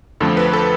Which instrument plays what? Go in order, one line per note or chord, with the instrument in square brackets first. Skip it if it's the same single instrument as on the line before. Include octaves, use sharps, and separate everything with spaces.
[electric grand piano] F2 D3 F3 A3 C4 A4
B4
A4